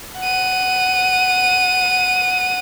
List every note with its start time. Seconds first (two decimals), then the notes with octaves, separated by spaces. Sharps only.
0.20 F#5 D#7